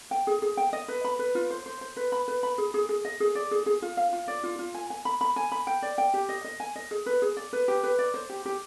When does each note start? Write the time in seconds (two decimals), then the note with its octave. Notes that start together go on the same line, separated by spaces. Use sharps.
0.11 G5
0.27 G#4
0.42 G#4
0.57 G5
0.73 D#5
0.88 B4
1.04 B5
1.19 B4
1.35 F4
1.50 C5
1.66 C5
1.81 C5
1.97 B4
2.12 B5
2.28 B4
2.43 B5
2.58 G#4
2.74 G#4
2.89 G#4
3.05 D#5
3.20 G#4
3.35 D5
3.51 G#4
3.66 G#4
3.82 F4
3.97 F5
4.13 F4
4.28 D5
4.43 F4
4.59 F4
4.74 G#5
4.90 G#5
5.05 B5
5.21 B5
5.36 G#5
5.52 B5
5.67 G5
5.82 D5
5.98 G5
6.14 G4
6.29 D#5
6.44 D#5
6.60 G#5
6.76 D#5
6.91 G#4
7.06 B4
7.22 G#4
7.37 D5
7.53 B4
7.68 G4
7.83 B4
7.99 D5
8.14 C5
8.30 G4
8.46 G4